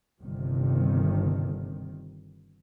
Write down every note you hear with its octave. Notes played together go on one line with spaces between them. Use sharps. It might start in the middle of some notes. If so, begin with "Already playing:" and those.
G1 C3 D#3